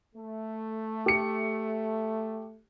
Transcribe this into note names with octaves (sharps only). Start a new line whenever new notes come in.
A3
G4 C#7